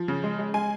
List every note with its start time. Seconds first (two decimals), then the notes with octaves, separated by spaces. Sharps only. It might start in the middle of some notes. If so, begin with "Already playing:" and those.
Already playing: F3
0.08 C#3
0.24 G#3
0.39 G#3
0.54 G#3 G#5